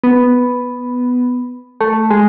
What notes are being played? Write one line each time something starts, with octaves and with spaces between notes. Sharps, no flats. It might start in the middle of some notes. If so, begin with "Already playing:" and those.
B3
A3
G#3